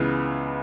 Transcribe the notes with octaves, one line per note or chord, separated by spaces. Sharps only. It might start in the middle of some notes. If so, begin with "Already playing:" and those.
Already playing: C#2 C#3 E3 B3